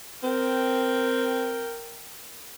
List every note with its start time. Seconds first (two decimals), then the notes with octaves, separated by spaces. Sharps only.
0.23 C4 A#4 G5